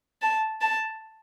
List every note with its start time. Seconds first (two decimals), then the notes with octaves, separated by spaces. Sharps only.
0.22 A5
0.61 A5